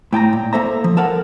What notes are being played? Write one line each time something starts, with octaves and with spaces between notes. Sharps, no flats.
A2 G5 A5 A#5
A#2
A#3 A4 C5 E5 A#5
F3
A4 A#4 F5 F#5